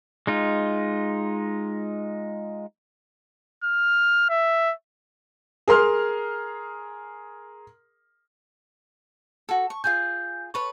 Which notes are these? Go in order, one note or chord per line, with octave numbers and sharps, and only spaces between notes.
G#3 D#4 F4
F6
E5
G#4 A#4 C6 F6
F#4 A4 A5
C#6
F4 G#4 G#5 G6
A4 B4 C#5 C#6